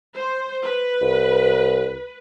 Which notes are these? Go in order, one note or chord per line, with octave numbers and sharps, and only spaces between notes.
C5
B4
C2